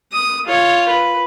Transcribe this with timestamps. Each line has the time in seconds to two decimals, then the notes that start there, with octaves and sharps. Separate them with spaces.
0.12 D#6
0.46 F4 C#5
0.88 B4